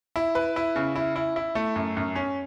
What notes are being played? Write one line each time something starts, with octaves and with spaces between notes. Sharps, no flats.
E4
B4
E4
C#3
E4
E4
E4
A3
F#2
F#2
C#4